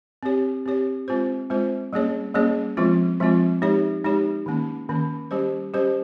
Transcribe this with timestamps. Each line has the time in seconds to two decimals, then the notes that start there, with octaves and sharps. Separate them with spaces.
0.23 C4 G4 C#5
0.66 C4 G4 C#5
1.08 G#3 C4 F4 C5
1.50 G#3 C4 F4 C5
1.93 G3 A#3 C#4 G#4 C#5
2.34 G3 A#3 C#4 G#4 C#5
2.77 F3 G#3 C4 F4
3.20 F3 G#3 C4 F4
3.62 G#3 D#4 G4 C#5
4.04 G#3 D#4 G4 C#5
4.46 D#3 A#3 C#4
4.89 D#3 A#3 C#4
5.31 G3 C#4 G4 C5
5.74 G3 C#4 G4 C5